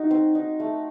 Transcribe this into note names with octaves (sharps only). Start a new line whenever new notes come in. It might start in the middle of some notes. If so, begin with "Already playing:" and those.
Already playing: D#4 F#4
C4
D#4
A3